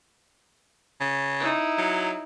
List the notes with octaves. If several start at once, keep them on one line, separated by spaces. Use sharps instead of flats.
C#3
D#4 E4
F#3